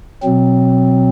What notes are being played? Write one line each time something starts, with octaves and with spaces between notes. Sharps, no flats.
B2 F#3 C4